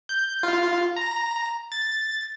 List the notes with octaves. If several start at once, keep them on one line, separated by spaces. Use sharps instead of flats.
G6
F4
A#5
A6